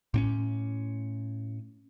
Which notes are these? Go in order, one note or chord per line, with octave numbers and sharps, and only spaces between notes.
A2 C4 C#4